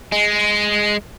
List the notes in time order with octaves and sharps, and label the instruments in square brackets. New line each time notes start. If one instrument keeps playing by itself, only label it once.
[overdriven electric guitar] G#3